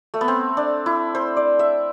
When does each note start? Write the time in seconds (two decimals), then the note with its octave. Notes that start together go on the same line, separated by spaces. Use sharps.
0.14 A3
0.21 B3
0.28 C4
0.57 D4
0.86 E4
1.15 C5
1.37 D5
1.59 E5